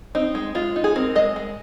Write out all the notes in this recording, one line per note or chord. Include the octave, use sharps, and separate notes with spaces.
C4 D#4
G#3
G#3 F4
D#4
G#4
C4 A#4
G#3 D#5
G#3